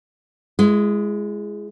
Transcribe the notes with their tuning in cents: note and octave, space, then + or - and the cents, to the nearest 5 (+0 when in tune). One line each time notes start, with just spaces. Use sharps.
G#3 +0 E4 +40